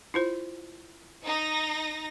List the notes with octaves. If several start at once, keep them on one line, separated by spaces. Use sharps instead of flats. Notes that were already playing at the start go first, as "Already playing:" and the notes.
E4 F4 C5
D#4 A#6